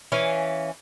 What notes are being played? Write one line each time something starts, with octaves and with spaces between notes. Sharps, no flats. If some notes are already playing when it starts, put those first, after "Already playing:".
E3 C#4 F5